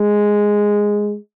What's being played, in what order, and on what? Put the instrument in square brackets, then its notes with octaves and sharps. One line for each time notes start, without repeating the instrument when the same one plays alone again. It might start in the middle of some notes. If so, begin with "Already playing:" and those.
Already playing: [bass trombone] G#3